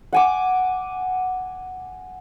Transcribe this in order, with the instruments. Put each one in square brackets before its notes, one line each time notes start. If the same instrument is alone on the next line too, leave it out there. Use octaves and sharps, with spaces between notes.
[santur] F#5 G#5 D6